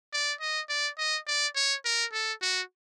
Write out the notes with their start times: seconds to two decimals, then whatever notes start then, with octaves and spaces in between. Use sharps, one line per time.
0.13 D5
0.41 D#5
0.69 D5
0.98 D#5
1.27 D5
1.55 C#5
1.85 A#4
2.13 A4
2.42 F#4